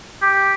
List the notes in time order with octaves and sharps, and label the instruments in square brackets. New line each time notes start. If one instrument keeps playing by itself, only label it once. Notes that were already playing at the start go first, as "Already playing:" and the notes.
[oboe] G4